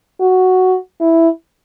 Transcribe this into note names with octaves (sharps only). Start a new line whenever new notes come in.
F#4
E4